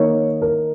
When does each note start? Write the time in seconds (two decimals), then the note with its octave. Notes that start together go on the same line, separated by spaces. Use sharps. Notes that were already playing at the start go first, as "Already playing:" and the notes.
Already playing: D#3 A#3 D#4 C#5
0.42 A#4